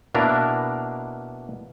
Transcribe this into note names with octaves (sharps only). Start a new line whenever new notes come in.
B2 A#3 D4 E4 A#4 B4